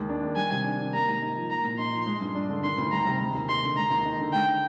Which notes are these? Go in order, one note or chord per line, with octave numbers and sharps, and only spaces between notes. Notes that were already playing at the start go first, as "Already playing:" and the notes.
Already playing: D#2 G#3
D4
D#3
G3 G#5
C3
D4
D#3
A#3 A#5
G#2
D#4
F3
A#3 A#5
A#2
D#4 C6
F3
G#3
G2
D4
D3
D#3 C6
D2
G3 A#5
C3
G#3
D#2
D#4 C6
D3
G#3 A#5
D#2
D#4
D3
G#3 G5